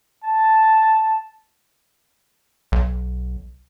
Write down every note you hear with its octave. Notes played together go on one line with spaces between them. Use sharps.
A5
B1